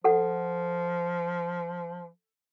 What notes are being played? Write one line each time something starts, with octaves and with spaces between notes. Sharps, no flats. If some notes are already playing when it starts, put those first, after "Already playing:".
F3 A4 F#5